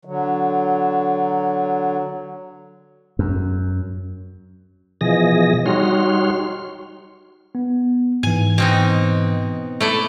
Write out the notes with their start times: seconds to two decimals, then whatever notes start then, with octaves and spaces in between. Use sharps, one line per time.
0.05 D3 F#3
3.19 F#2
5.01 B2 E3 F3 G#4 D#5 A#6
5.66 G3 D#4 F#4 C#5 C6 F6
7.55 B3
8.23 G#2 E3 G#5
8.58 B2 C4 D#4
9.80 A3 E4 D5